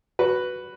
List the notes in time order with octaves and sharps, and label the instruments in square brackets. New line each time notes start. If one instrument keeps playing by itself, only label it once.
[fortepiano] F#4 B4